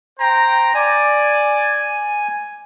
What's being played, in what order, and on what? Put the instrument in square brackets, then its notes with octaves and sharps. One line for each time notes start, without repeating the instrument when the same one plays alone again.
[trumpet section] C5 G5 A#5
[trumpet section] D5 [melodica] G#5